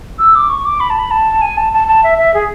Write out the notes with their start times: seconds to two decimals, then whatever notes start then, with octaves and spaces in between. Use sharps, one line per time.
0.19 E6
0.35 D6
0.49 C#6
0.65 D6
0.80 B5
0.90 A5
0.99 B5
1.11 A5
1.42 G#5
1.57 A5
1.73 A5
1.88 A5
2.03 E5
2.18 E5
2.34 G#4